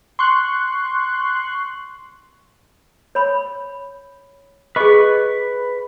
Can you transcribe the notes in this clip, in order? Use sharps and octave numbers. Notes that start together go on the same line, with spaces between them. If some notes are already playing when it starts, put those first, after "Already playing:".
C6 C#6 F#6
C#5 B5
G#4 B4 D#5 C#6